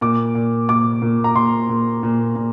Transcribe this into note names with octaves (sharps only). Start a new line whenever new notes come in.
A#2 D6
A#2
A#2 D6
A#2
A#5
A#2 C6
A#2
A#2
A#2